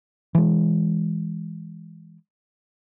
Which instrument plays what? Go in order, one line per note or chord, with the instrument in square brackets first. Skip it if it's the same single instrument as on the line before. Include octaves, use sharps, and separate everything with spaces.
[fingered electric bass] E3 G#3